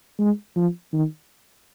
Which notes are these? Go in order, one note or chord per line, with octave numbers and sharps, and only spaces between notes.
G#3
F3
D#3